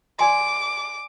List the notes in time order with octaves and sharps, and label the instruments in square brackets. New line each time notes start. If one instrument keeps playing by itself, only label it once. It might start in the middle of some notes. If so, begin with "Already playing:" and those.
[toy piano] D5 G#5 C6 [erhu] D6